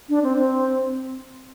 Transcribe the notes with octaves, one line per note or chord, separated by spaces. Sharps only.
D4
C4
C4